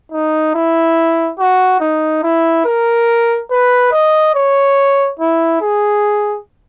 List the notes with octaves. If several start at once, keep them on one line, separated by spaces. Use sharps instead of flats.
D#4
E4
F#4
D#4
E4
A#4
B4
D#5
C#5
E4
G#4